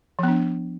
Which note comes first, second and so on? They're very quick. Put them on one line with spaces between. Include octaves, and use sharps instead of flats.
F3 B3 D4